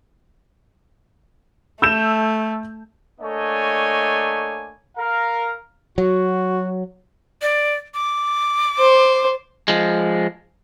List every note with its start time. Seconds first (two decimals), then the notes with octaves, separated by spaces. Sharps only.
1.82 A3 E6 G6 E7
3.20 A3 A#3 D4 C#5 D#5 G#5
4.97 A#4 F5 A#5
5.98 F#3 F#4
7.42 D5
7.94 D6
8.79 C5
9.68 F3 G#3